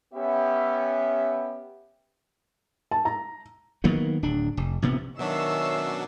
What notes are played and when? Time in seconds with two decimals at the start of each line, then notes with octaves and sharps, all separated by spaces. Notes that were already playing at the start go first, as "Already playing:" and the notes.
0.14 B3 C#4 G4 E5
2.91 A5
3.05 A#5
3.84 D#3 F#3 A#3 B3
4.23 D1 D4
4.57 F1
4.82 A#1 C3 B3
5.19 B2 D#3 F#3 C#4 D4 E5 E6 C7